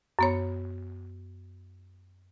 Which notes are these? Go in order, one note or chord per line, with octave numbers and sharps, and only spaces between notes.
F#2 B3 C#5